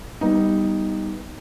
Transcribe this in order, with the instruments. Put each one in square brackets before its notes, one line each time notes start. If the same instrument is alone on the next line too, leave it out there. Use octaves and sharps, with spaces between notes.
[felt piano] G3 B3 D#4